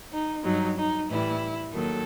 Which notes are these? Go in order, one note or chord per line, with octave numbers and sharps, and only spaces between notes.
D#4
G2 F#3 D#4
D#4
A2 E3 G3 E4
D#2 D#3 F#3 A4